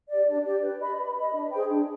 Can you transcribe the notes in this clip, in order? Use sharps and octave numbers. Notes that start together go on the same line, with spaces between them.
G4 D5
D4
G4 D5
B4
D#5 B5
B4
D#5 B5
D4
G#4 C5 G5
D4